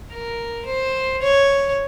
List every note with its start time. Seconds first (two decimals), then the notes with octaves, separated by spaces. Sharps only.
0.11 A#4
0.65 C5
1.22 C#5